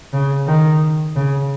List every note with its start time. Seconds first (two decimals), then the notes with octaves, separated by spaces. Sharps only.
0.13 C#3
0.47 D#3
1.16 C#3